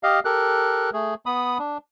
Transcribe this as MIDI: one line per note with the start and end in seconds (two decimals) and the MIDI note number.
0.03 0.20 67
0.03 0.20 75
0.03 0.20 77
0.25 0.90 67
0.25 0.90 69
0.25 0.90 70
0.25 0.90 90
0.93 1.14 57
0.93 1.14 68
1.26 1.58 59
1.26 1.58 83
1.26 1.58 87
1.59 1.78 62